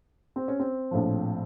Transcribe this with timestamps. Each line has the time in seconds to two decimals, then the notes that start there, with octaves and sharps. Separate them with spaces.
0.36 C4
0.48 C#4
0.60 C4
0.91 A#1 A2 F3